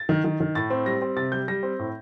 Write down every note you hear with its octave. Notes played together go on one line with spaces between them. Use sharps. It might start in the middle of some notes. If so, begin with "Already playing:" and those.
Already playing: A6
D#3
D#3
D#3
A2 A6
C4
G3 A#6
C4
C3 A6
G3 G6
G3 A#6
C4
A2